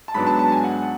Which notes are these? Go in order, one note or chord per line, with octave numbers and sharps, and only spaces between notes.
A5
G#2 F#3 B3 D4 B5
A5
A5
G#5
F#5